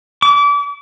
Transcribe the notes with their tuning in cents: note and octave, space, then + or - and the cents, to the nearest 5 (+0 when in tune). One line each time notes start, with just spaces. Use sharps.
D6 -30